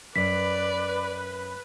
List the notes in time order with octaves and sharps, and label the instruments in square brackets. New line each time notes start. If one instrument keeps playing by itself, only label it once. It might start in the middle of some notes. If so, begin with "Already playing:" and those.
[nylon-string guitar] F#2 [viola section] B4 [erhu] D5 [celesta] B6